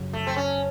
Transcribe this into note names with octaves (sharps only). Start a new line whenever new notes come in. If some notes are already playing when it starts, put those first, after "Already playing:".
Already playing: F#2 C#3 F#3
A3
C4
C#4